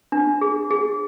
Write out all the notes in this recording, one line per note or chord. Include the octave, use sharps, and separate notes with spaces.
D4
G#4
G#4